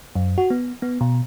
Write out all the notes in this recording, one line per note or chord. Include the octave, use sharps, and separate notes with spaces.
F#2
F#4
B3
B3
B2